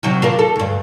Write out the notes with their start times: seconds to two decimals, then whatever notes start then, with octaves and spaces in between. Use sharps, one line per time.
0.03 C3 D#3 F#3
0.22 D4 F4 A#4
0.39 A4
0.56 D2 G2